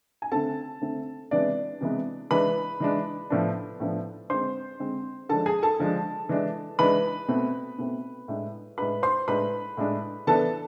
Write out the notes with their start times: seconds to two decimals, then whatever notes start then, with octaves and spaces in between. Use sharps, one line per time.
0.22 G#5
0.32 D3 A3 C4 A4 A5
0.81 D3 A3 C4
1.31 C3 E3 G#3 B3 D4 D5
1.81 C3 E3 G#3 B3
2.31 E3 G#3 D4 B4 B5
2.80 E3 G#3 D4
3.30 A2 F3 B3 D4
3.80 A2 F3 B3 D4
4.29 D3 G#3 C4 C5 C6
4.79 D3 G#3 C4
5.29 D3 F3 G#3 D4 A4 A5
5.46 G#4 G#5
5.63 A4 A5
5.79 D3 F3 G#3 D4
6.29 E3 G#3 D4
6.79 E3 G#3 D4 B4 B5
7.28 B2 A3 C4
7.78 B2 A3 C4
8.28 A2 G#3 D4
8.78 A2 G#3 D4 B4 B5
9.03 C5 C6
9.28 A2 G#3 D4 B4 B5
9.77 A2 G#3 D4
10.27 E3 B3 D4 A4 A5